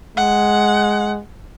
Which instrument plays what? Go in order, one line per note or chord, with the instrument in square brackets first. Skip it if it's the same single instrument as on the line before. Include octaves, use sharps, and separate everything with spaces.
[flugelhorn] G#3 [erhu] F#5